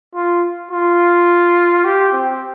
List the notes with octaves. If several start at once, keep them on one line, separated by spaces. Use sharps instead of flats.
F4
F4
G4
C4